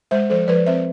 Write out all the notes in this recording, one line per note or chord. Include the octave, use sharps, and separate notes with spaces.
G#3 C5 E5
F3 A4 C5
F3 B4 D5
C4 C5 E5